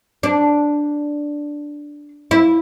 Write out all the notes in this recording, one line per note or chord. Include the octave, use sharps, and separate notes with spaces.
D4
E4